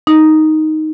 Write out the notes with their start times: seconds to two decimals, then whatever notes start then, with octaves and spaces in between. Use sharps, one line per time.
0.07 D#4